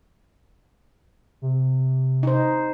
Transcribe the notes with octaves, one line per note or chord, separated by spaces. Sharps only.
C3
D#4 C5